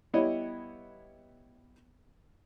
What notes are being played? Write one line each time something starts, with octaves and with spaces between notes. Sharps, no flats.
G3 B3 E4 C#5 D#5